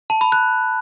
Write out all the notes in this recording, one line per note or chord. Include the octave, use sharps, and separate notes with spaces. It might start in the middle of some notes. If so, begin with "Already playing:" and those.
A5
B5
F#6